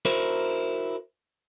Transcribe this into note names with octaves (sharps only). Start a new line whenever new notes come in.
E4 F#4 A#4 C5